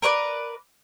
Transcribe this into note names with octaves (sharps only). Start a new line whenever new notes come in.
A#4 B4 C#5 D5